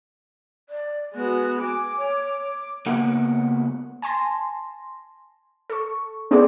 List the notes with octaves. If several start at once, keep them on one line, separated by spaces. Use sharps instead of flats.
D5
G#3 B3 F#4
G#5 D6
C#5
C#2 A#3 B3 A#4 F#5
G#5 A5 C6 A#6
A4 C#6
B3 C4 D4 G#4 A4 D5